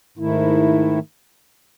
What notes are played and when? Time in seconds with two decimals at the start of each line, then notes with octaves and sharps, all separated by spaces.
0.18 G#2 D#3 A3 E4